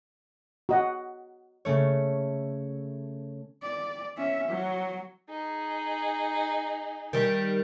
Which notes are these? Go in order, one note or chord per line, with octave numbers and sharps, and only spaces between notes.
F#4 D#5 F#5
C#3 A3 C#5
D5
C#4 E5
F#3
D#4 G#4
D#3 G3